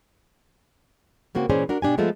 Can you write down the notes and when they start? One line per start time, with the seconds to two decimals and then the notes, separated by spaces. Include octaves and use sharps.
1.35 C#3 A#3 C4 F#4
1.49 A#2 E3 C#4 G#4 C5 D5
1.69 D4 F#4 A#4
1.82 B2 D4 G4 G#5
1.98 F3 G#3 A3 B3 F4